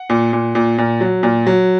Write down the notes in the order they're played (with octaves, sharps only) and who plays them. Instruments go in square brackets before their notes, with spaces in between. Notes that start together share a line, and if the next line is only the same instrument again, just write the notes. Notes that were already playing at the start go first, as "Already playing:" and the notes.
Already playing: [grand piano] F#5
A#2
A#2
A#2
A#2
F#3
A#2
F#3